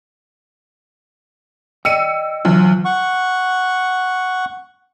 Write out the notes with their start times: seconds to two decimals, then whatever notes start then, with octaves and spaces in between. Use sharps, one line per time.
1.85 D5 D#5 G5 E6 C#7 D#7
2.45 D2 E3 F#3 F4
2.85 F#5 C#6